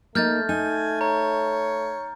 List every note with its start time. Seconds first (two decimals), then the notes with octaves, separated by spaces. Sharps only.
0.15 A3 A#3 D#4 F6 G6 A6
0.49 D#4 G#5
1.01 C#5 A#5